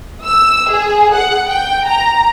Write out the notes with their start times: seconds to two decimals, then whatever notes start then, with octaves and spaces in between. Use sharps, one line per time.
0.23 E6
0.70 G#4
1.13 F#5
1.50 G5
1.87 A#5